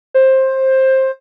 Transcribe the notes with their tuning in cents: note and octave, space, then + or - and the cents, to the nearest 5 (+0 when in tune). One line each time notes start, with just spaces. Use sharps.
C5 +15